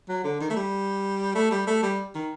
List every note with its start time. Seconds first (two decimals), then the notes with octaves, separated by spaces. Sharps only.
0.09 F#3
0.24 D3
0.41 D#3
0.50 A3
0.56 G3
1.35 A3
1.51 G3
1.67 A3
1.82 G3
2.15 D#3